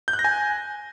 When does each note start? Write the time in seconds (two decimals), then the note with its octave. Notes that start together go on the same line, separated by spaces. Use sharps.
0.08 G6
0.13 F#6
0.19 A#6
0.25 G#5